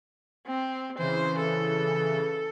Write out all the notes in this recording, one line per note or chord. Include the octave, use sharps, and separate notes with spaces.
C4
C#3 E3 C5
A4